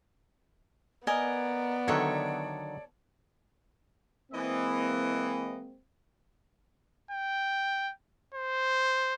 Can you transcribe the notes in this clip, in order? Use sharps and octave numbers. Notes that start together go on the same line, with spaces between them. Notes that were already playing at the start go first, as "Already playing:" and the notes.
B3 A#4 D5 D#5 G#5
D3 D#3 F#3 A4 C#5 E5
E3 G#3 A#3 C4 D#5
G5
C5